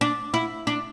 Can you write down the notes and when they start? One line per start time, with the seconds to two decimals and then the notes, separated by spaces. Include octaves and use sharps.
0.01 D4
0.34 E4
0.67 D4